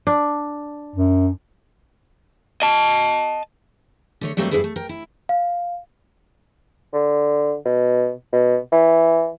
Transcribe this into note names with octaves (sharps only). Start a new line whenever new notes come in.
D4
F#2
D#5 A5
D3 A3 C#5
G2 F#3 G3 A3 A#3 C4
G2 G#3 E4 G#4 A4 B4
A3
A#4 G5
E4
F5
D3
B2
B2
E3